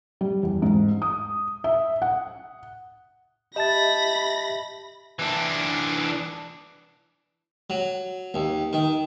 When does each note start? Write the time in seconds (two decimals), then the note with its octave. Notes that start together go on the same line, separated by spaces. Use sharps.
0.21 G3
0.43 E2
0.62 G#2
1.02 D#6
1.64 E5
2.02 F#5
3.56 G4 D#5 E5 A5 B5 A6 A#6
5.19 E3 D4
7.70 F#3
8.34 D#2
8.73 D#3